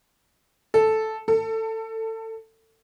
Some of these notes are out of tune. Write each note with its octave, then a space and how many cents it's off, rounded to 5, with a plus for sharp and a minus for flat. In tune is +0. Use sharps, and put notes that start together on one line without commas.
A4 -5
A4 +20